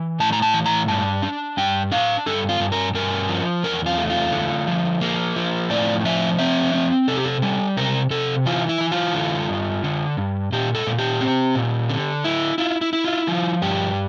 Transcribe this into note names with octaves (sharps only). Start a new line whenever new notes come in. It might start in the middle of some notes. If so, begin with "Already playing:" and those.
Already playing: E3
A2 A5
A#5
A5
E3
A#5
G2 A5
D4
G2 G5
D4 F5
G2 A4
F4
G2
A#4
G2 A#4
F3
E2 A#4
F4
A3
F4
D3
F3
A#3
F3
A2 D5
F3 E5
C4 E5
C4
C3 A4
G4
A4
G3 A4
C3 A#4
C3 A4
E3 F4
E4
E3
F4
D3
G2
D3
G2
A#2 G4
A4
A#2
G4
C4
A#2
D3
E4
E4 F4
E4
E4
F4
F3 F4
G2 G4